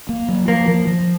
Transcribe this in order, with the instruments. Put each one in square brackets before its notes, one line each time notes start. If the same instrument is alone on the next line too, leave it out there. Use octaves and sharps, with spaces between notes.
[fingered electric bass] A#3
F#3
[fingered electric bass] F3 [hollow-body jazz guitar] A#3
[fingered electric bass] F3
F3